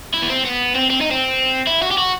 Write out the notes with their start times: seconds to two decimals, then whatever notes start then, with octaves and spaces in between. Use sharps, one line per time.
0.14 E4
0.22 B3
0.29 C4
0.45 B3
0.75 C4
0.90 C4
1.01 D#4
1.11 C4
1.67 E4
1.82 F#4
1.91 G4
1.98 F#4